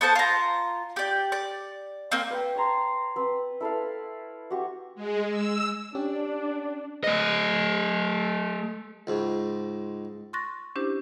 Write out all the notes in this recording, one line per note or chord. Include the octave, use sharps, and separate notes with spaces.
B3 A4 C5 A5
F4 A#5
G4 D5
D5
A#3 C4
B4 G5
C#5 A5 A#5 C6
C4 B4
E4 A4 B4 F5
F#4 G4 C#6
G#3
E6
C#4 D4 G4
A3 D#5
C#2 G#2
C6 C#6 F#6 A6 A#6
C#4 D4 E4 G4 C5